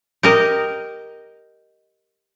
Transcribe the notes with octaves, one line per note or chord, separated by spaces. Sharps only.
G4 A#4 D#5